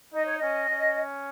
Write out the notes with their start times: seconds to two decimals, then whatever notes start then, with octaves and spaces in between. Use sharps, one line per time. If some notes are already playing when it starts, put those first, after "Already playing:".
0.14 D#4 D#5
0.25 C#5
0.38 C#4 D#5
0.69 C#4